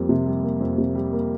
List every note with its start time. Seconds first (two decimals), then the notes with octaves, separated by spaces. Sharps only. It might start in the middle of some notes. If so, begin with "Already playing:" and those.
Already playing: F2 G3 A#3
0.09 C3
0.26 G3
0.43 A#3
0.60 F2
0.78 C3
0.95 G3
1.13 A#3